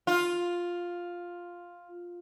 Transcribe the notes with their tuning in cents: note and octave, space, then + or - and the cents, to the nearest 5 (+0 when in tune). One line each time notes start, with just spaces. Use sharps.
F4 +5